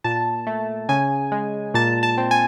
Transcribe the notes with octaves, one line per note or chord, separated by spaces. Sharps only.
A#2 A5
A3
C#3 G#5
G#3
A#2 A5
A5
C4
G#5